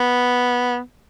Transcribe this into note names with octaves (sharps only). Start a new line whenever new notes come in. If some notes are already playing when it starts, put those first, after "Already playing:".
Already playing: B3